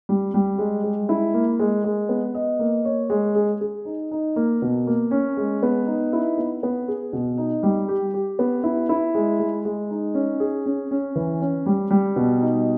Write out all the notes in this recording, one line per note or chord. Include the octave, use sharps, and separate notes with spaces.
G3
G3
G#3
G#3
E4
A#3
G#3
G#3
B3
D#5
A#3
C#5
G#3
G#4
G#4
D#4
D#4
A#3
B2
A#3
C#4
G#3
B3
D#4
E4
B3
B3
G#4
B2
D#4
G3
G4
G4
B3
E4
E4
G#3
G#3
G#3
D#4
C#4
G#4
C#4
C#4
E3
C#4
G3
G3
B2
D#4